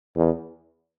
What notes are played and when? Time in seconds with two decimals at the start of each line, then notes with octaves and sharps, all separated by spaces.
0.16 E2